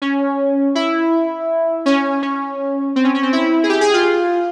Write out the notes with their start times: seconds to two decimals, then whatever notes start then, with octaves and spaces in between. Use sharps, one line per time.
0.02 C#4
0.75 E4
1.86 C#4
2.23 C#4
2.96 C4
3.04 C#4
3.15 C#4
3.23 C4
3.33 E4
3.63 G#4
3.69 G4
3.81 G#4
3.94 F4